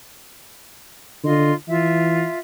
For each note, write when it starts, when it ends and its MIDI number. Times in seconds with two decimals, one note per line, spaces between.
1.24 1.52 50
1.24 1.54 65
1.24 1.54 75
1.24 1.54 84
1.68 2.25 52
1.68 2.38 65
1.68 2.38 76